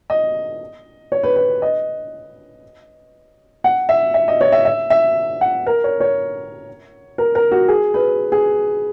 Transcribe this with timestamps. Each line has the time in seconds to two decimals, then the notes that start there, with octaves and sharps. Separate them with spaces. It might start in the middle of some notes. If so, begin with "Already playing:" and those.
0.10 D#5
1.12 C#5
1.23 B4
1.36 B4
1.62 D#5
3.64 F#5
3.89 E5
4.14 E5
4.28 D#5
4.41 C#5
4.52 E5
4.65 E5
4.90 E5
5.41 F#5
5.67 A#4
5.84 C#5
6.00 C#5
7.18 A#4
7.35 A#4
7.51 F#4
7.68 G#4
7.94 B4
8.32 G#4